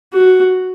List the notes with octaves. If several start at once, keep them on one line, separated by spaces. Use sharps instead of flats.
F#4